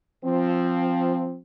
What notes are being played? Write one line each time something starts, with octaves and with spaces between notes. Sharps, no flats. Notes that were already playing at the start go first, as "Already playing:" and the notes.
F3 C4